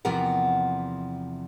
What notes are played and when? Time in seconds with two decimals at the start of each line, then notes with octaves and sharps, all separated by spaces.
0.05 E2 C3 F3 B3 A#4 F#5